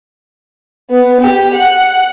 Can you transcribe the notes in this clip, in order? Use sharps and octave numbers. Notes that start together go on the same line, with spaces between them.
B3
G4
F#5